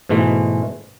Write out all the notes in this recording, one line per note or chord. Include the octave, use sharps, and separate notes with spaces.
G#2 B2 E3 G#3 A3